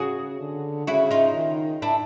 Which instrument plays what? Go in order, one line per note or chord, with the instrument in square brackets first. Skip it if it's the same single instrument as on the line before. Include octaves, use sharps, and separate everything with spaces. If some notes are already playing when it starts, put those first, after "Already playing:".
Already playing: [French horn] C#3 [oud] F#4 G#4
[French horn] D3
[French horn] C#3 [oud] E4 F#4
[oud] D#4 F4
[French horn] D#3
[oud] D4 E4